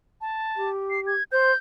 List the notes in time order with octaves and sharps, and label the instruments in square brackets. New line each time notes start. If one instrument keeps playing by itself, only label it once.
[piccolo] A5
[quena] G4
[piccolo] C7
G#6
[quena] C5 [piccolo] G6